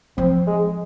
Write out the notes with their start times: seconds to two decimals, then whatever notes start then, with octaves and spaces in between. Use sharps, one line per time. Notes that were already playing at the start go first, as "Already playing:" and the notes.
0.18 F3 C4
0.47 G#3